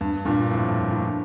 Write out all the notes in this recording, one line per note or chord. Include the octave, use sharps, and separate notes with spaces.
G2
G2 A#2
F2 A2
A2